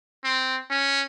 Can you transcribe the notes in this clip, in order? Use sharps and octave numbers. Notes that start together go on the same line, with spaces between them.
C4
C#4